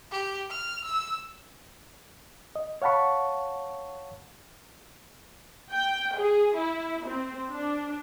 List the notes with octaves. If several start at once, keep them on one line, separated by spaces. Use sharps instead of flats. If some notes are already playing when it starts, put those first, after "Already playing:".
G4
F6
E6
D#5
C#5 F5 F#5 A5 B5 C#6
G5
G#4
E4
C4
D4